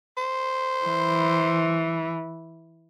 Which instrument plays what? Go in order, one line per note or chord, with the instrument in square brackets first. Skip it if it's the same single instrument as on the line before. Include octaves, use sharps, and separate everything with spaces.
[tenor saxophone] C5
[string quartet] E3